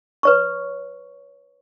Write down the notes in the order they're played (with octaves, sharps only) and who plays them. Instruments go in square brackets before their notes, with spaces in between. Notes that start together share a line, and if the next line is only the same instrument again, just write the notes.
[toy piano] B4 C#5 C#6